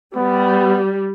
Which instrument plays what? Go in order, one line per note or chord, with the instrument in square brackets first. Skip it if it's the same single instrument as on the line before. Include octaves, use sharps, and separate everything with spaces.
[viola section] G3 [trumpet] B3